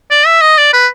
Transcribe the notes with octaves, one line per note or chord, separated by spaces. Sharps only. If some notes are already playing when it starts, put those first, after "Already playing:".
D5
E5
D#5
D5
B4